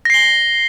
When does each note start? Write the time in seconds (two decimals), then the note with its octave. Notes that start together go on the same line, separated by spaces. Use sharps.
0.05 A#6
0.10 C7
0.14 G7